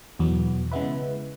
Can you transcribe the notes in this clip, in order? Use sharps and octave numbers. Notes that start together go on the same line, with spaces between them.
E2 B2 F#3 B3
C#3 G#3 B3 E4 B4